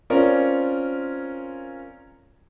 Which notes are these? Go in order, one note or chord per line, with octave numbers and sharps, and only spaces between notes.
C4 C#4 F4 A#4 C#5 D5